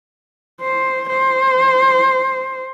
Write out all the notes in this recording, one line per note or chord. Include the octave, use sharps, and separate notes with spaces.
C5
C5